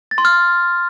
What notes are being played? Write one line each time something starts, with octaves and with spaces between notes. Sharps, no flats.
A6
C6
F6